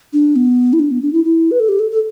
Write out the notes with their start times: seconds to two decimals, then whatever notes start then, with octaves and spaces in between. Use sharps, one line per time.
0.13 D4
0.36 B3
0.73 E4
0.79 D4
0.91 B3
1.02 D4
1.13 E4
1.25 E4
1.51 B4
1.60 A4
1.69 G4
1.79 A4
1.91 A4